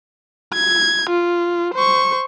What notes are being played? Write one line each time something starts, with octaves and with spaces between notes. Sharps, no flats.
G#6
F4
C5 C#6